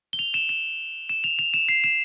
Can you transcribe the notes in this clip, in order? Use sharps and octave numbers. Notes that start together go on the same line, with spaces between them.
G7
F7
E7
E7
E7
F7
F7
E7
C7
E7